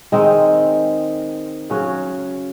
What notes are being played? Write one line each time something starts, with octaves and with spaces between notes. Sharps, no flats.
D#3 G#3 C4 D#4
C#3 F#3 C#4 F#4